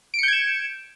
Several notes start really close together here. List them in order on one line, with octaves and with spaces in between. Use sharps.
D7 C#7 G6 G#6 E7